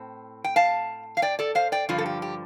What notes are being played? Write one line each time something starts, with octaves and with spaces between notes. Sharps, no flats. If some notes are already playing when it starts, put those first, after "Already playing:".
Already playing: A2 C4
G5
F5 A5
F5
D5 G5
A4 D5
C5 F5
D5 G5
G2 D3 F3 F4
A4
G4
G4